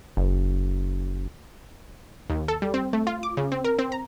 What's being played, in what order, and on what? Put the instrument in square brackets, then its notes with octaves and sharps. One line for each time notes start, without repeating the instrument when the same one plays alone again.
[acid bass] F#1
[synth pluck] D#2
A4
G3
C4
A3
F4
D6
C#3
C4
A#4
C4
A#5